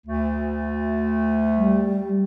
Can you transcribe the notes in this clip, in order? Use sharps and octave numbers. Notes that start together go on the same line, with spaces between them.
D2 A3
G3